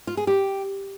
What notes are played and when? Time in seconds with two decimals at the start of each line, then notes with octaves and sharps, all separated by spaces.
0.07 F4
0.17 G#4
0.27 G4